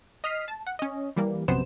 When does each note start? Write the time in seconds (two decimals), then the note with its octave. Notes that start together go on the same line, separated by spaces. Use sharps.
0.24 D#5 D#6 F6 B6 C7
0.48 A5
0.67 F#5
0.79 C#4 D#5
1.16 E3 G3 A#3
1.48 A#1 F#2 C3 B3 C5 E7